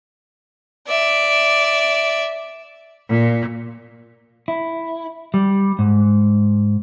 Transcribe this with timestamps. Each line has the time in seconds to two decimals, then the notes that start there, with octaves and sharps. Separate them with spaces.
0.88 D5 E5
3.09 A#2
4.48 E4
5.34 G3
5.79 G#2